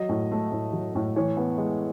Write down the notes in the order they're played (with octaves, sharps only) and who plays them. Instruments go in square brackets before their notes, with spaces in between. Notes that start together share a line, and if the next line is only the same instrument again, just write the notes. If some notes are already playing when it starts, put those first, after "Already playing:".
Already playing: [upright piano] F#3 D#5
A2
A3
A2
F#3
A2
E3 C#5
B3
G#3